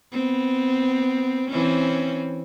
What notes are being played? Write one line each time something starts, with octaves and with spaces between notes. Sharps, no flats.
B3 C4
E3 C4 C#4